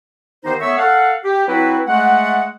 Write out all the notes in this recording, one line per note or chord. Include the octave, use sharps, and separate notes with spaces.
D#2 D#3 B3 D#4 G4 C5
A3 B3 C#5 E5 C#6 E6
A4 F5 F#5
G4
F#3 C4 E4 B4
G#3 A3 F#5